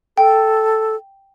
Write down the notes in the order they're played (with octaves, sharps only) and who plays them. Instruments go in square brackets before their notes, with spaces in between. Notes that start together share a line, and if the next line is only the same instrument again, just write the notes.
[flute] A4 [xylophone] G5